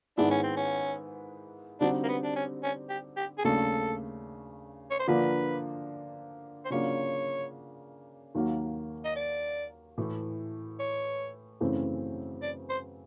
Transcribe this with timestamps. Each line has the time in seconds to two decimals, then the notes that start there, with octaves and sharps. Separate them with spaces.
0.18 G#2 D#3 G#3 B3 D4 E4
0.30 C#4
0.43 C4
0.57 C#4
1.80 D3 G3 C4 D4 D#4 F#4
2.04 A#3
2.09 B3
2.24 D4
2.36 C#4
2.63 C#4
2.89 G4
3.17 G4
3.38 G#4
3.44 D#2 C#3 F#3 A3 D4 A4
4.91 C#5
4.99 C5
5.08 D3 F3 A#3 D4 F4 B4
6.65 C5
6.70 C#3 F#3 A#3 D4 F4 C#5
8.35 D#2 D#3 F#3 A#3
9.05 D#5
9.16 D5
9.98 A2 E3 A3
10.80 C#5
11.61 F#2 C#3 E3 A3 C4
12.42 D5
12.70 C5